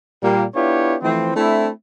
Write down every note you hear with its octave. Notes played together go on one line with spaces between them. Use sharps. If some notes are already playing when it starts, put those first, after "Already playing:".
A#2 G3 A#3
B3 D4 E4 F4 G4 C#5
E3 F3 A3 C4
A3 C4 D4 E4